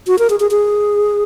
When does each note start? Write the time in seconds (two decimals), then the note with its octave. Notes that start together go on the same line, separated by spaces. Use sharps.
0.07 F#4
0.19 A#4
0.30 G#4
0.40 G#4
0.51 G#4